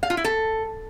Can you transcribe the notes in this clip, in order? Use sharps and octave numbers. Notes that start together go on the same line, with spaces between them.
F5
F4
E4
A4